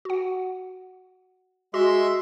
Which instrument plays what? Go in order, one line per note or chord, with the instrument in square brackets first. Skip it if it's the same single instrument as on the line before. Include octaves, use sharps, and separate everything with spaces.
[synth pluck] F#4 F#5
[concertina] G#3 E5 C6 [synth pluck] F#4